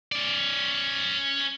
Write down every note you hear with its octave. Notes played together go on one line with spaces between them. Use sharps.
C#4 D5